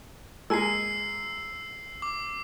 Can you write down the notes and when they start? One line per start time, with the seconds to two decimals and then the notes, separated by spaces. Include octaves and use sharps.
0.50 G#3 A#3 G#5 E6 C7
2.02 D6